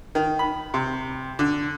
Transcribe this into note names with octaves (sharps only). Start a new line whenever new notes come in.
D#3
B5
C3
D3